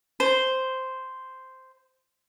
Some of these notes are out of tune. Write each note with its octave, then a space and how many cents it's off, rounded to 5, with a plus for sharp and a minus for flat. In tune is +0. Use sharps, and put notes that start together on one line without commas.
C5 -5